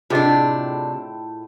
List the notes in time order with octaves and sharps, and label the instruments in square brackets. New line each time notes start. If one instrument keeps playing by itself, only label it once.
[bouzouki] A2 [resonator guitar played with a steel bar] C3 D4 [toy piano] F4 G#4 D#5